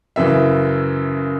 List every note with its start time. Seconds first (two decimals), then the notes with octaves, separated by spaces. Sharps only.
0.16 F#2 C#3 E3 E5